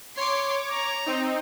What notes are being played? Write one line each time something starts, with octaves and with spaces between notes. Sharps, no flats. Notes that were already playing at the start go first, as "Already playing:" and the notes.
C#5 C6 D6
A#5
C4 D#4